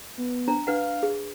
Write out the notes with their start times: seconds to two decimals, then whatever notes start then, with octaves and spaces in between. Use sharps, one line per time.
0.18 B3
0.48 D4 C5 A#5
0.67 D4 B4 F5 F#5
1.03 G#4